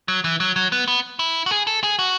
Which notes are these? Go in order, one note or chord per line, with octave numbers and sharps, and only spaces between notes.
F#3
E3
F#3
F#3
B3
B3
E4
F#4
G#4
A4
G#4
F#4